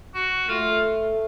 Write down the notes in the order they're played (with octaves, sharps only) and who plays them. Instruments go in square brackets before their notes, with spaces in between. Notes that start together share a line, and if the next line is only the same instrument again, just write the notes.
[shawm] F#4
[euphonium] A3 [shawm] F4